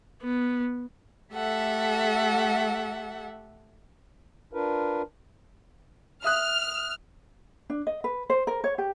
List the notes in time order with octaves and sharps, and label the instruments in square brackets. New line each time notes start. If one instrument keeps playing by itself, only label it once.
[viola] B3
[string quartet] A3 G4 A4 E5 F#5
[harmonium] D4 F4 A#4 B4
[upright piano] E5 D#6 F#6 [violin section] F6
[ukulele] D4
D#5
B4
C5
A#4
C#5
G4